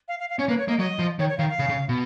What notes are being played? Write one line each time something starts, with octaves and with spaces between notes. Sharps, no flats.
F5
F5
F5
C#4 C#5
A#3 B4
C#5
A#3 D#5
F#3 D#5
F3
D#3 C#5
C#5
D#3 F5
F5
C#3
C#3
B2